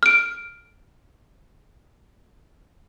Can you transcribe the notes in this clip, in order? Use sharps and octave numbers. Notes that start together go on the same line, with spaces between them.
F6 D7